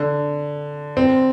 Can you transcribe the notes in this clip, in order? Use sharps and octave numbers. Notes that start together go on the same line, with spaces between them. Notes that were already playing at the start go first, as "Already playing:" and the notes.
Already playing: D3
C4